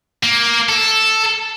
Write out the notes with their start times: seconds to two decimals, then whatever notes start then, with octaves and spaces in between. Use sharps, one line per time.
0.23 A#3
0.69 A4